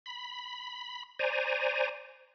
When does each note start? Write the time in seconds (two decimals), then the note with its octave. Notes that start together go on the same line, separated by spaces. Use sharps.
0.06 B5
1.19 C5 D5 G#5 A#5